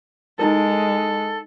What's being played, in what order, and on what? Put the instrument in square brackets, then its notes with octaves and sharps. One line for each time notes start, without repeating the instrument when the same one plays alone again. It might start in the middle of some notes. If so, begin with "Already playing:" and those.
[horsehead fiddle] G#3 [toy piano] D#4 E4 A#4 [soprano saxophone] A4